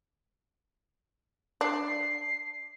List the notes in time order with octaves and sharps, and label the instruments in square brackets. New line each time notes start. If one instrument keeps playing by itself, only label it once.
[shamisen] D4 [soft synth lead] C7